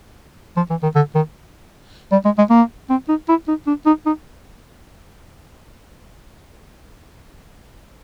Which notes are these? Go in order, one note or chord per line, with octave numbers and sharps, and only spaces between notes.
F3
E3
D#3
D3
D#3
G3
G#3
G#3
A#3
C4
D#4
E4
D#4
D4
D#4
D#4